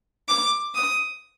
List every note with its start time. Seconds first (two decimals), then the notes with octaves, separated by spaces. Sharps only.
0.28 D6
0.74 D#6